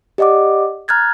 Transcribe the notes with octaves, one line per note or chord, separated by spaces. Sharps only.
G4 D5 D#5 F#5 D6
A#5 F6 F#6 G#6 A6